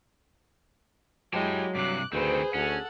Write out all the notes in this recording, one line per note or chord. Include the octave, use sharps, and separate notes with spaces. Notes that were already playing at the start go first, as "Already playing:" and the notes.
F#3 G#3 E4 G4 G5 A5
G2 C3 D6 F#6
D2 D#3 C4 G#4 B4 C5
D2 C#4 A4 F#5